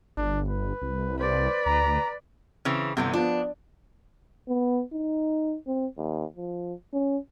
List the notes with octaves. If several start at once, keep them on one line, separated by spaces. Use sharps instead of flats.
G1 D4
B4
C2
B4 C5 D5
D2 A#5
C#3 E3 C4
G1 C3 E3 B3
F3 B3 D4
B3
D#4
C4
D#2
F3
C#4